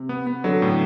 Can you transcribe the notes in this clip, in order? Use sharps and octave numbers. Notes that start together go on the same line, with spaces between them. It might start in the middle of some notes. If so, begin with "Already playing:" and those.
Already playing: C3
B3
B3
D3 F#3
A2